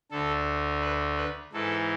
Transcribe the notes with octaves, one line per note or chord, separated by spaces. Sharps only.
D2 D3 A4
B4
B4
G#2 E3 A4